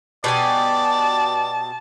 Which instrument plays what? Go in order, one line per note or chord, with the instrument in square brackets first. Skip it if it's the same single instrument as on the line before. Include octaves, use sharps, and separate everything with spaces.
[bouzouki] B2 G4 G#5 [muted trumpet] D5 [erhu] A5